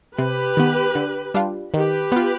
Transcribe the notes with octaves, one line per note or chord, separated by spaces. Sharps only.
C3 G4 B4
D#3 B3
D3
G3 D4 F4
D#3 G4 B4
B3 F4